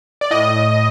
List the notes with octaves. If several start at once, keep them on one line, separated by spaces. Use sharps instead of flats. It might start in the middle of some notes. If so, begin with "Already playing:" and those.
D5
A2 D#5